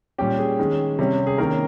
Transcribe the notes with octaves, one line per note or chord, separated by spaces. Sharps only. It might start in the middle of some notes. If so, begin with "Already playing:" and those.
A#2 G3 C#4 G4
G#4
D#3 G#3 C#4
C3 G3 C#4
G#4
D#3 A#3 C#4 A#4